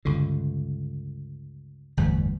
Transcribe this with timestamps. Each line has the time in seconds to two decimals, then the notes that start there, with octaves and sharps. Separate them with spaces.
0.05 C#2 G2 D3
1.97 G1 E2 A2 G3